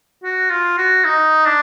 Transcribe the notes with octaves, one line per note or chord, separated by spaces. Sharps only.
F#4
F4
F#4
D#4
D4